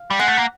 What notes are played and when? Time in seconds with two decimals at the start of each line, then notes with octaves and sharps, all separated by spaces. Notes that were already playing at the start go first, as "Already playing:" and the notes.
Already playing: F5
0.11 G3
0.19 G#3 F#5
0.28 A3
0.37 A#3